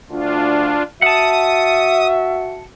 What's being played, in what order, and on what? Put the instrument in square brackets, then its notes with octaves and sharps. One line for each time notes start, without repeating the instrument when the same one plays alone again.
[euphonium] D2 [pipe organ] D4 F4
[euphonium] F#4 [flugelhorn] E5 [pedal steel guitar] F#5 A5 [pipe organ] D#6